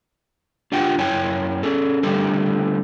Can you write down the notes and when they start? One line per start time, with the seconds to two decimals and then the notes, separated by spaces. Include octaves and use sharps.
0.72 D4 F4 G4 F#5 G5
0.98 F#2 E4 C#5 G5 G#5
1.63 C#4 G#4 A4
2.03 D3 G3 A3 C4 G4 A4